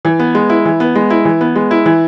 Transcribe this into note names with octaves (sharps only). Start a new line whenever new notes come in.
E3
B3
G#3
E4
E3
B3
G#3
E4
E3
B3
G#3
E4
E3